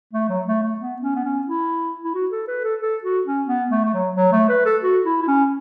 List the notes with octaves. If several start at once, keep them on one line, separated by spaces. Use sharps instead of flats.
A3
F#3
A3
A3
B3
C#4
B3
C#4
E4
E4
F#4
A4
B4
A4
A4
F#4
C#4
B3
A3
A3
F#3
F#3
A3
B4
A4
F#4
E4
E4
C#4